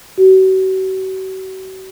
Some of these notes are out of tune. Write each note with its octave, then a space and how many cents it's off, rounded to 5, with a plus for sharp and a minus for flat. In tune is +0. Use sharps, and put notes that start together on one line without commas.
F#4 +40